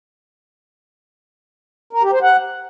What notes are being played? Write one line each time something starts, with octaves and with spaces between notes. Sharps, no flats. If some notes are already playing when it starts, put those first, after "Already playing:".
A#4
G4
C5
F#5